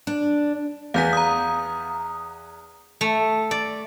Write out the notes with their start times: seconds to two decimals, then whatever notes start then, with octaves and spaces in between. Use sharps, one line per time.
0.07 D4
0.94 E2 B3 F5 G#5 G6 B6
1.13 A#5 D#6
3.01 A3
3.51 D5